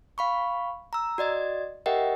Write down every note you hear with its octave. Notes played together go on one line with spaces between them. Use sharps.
F5 B5 C#6
A#5 E6
F#4 D5 D#5 G#6
G4 A#4 D#5 E5 F#5 G5